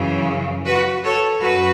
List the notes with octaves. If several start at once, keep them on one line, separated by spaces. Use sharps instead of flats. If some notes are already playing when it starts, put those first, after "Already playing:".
Already playing: F#2 C#3 E3
F#4 B4
A4 C#5
F#2 F#4 B4